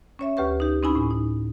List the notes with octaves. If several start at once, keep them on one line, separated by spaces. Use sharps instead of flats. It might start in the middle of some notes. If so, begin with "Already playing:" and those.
C#4 C#5 E5
D2 G4 B4 C#6
D#4 G4
C4 C#4 D#4 E4 G#5 B5
A2
D#4